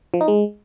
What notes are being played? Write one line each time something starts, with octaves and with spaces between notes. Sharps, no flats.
F3
D#4
G#3